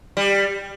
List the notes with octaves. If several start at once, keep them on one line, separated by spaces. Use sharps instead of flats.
G3